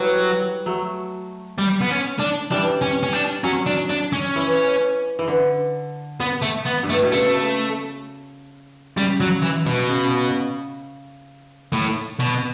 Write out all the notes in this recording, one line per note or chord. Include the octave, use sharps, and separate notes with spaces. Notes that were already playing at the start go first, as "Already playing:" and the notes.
Already playing: E3 F#3 G3
F#3 A3
G3
B3
C#4
D4
E3 G3 D4
C#4
C#4
D4
F#3 C#4
D4
D4
C#4
E3
E3
D3
B3
A3
B3
G2
A3
A2
B2
C#3 A3
C#3 G3
F#3
E3
B2
C#3
A2
B2